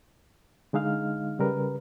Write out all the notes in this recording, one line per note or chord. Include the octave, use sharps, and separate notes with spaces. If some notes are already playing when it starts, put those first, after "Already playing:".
D3 G#3 D#4 F5 F6
C#3 G3 A#4 B4